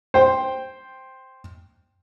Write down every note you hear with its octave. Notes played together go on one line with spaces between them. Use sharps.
C5 G5